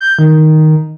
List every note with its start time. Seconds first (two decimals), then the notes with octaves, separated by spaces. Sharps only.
0.01 G6
0.19 D#3